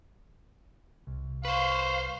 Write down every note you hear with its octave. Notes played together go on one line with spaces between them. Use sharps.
C2
B4 C5 F5 C#6